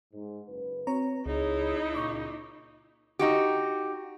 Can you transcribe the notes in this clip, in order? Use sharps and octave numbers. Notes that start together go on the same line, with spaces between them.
G#2
F#1 B4
C4 F#4 B4 C#5 A#5
C#2 D#4 E4 G#4 C#5
A#2 C#3 C#6 D6
D#4 F#4 G4